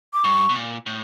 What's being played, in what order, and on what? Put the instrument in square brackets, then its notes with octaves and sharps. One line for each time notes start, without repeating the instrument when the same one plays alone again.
[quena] D6
[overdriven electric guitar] G2 [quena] C#6
[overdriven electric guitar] B2
A#2
A2